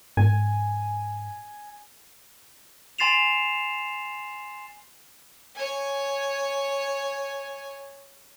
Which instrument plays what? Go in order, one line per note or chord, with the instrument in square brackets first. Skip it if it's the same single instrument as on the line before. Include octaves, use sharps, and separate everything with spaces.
[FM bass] G#2 [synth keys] G#5
[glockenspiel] G#5 C6 A6 C7 E7 F7
[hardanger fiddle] C#5 G#5